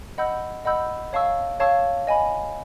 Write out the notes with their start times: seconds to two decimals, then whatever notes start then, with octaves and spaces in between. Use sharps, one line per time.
0.18 D#5 F#5 B5 E6 G6
0.65 D#5 F#5 B5 E6 G6
1.13 C#5 F5 A5 C#6 E6
1.60 C#5 F5 A5 C#6 E6
2.07 D#5 G#5 B5